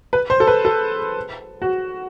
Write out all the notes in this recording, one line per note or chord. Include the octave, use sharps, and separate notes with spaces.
B4
C5
A4
B4
A4
F#4